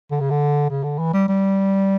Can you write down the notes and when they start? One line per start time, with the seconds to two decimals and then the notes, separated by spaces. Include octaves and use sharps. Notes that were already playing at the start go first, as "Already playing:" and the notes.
0.11 D3
0.20 C#3
0.31 D3
0.70 C#3
0.84 D3
0.99 E3
1.13 G3
1.28 G3